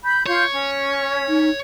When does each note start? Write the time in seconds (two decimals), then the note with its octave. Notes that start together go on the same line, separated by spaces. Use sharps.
0.03 B5 G6
0.26 F4 C#5 C6 G6
0.52 C#4
1.29 D#4